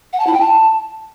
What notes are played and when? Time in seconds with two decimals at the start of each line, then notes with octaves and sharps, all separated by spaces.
0.12 F#5
0.19 A5
0.26 E4
0.33 G5
0.40 A5